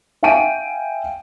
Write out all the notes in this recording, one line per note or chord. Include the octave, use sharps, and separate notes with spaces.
E5 F5 G5 G#5 D7 D#7